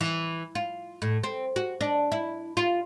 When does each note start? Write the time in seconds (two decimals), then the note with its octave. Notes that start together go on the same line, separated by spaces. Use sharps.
0.01 E3
0.55 F4
1.02 A2
1.24 C4
1.56 F#4
1.81 D4
2.12 E4
2.57 F4